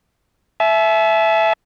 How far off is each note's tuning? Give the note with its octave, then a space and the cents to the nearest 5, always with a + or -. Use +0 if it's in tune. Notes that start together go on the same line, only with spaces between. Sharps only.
E5 +5 A5 -45